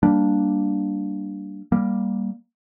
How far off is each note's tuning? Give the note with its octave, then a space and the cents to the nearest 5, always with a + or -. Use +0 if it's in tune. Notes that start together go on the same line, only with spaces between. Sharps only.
G3 +0 A#3 +0 D4 +0
G3 +0 A#3 +10